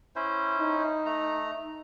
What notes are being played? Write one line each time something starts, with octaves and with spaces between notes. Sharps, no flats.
C#4 E4 C5
D#4
A3 A#5